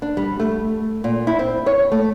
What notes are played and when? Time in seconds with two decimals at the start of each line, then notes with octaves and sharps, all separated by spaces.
0.02 D4
0.17 G3
0.40 A3
1.04 A#2
1.27 E4
1.39 C4
1.66 C#5
1.92 A3